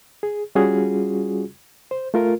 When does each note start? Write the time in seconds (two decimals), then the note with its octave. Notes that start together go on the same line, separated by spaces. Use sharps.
0.23 G#4
0.55 G3 C#4 F4 F#4 G#4
1.91 C5
2.14 A3 F4 A#4